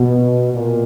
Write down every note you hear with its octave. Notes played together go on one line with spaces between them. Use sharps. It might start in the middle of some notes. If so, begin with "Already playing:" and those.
Already playing: B2
A#2